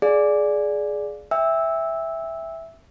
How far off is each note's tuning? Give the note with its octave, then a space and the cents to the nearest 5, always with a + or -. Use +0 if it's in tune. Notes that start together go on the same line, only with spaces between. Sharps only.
G#4 +15 D5 +0 F5 +0
E5 +0 G5 +35 E6 -10